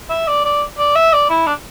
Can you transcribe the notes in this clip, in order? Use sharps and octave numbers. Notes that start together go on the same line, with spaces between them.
E5
D5
D5
D5
E5
D5
E4
D4